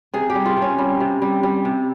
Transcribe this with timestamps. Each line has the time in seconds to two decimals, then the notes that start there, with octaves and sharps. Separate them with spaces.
0.13 C3 G#4
0.30 G4
0.35 G3
0.46 F4
0.57 C3 C#4
0.78 G3
1.00 C3
1.22 G3
1.43 G3
1.65 C3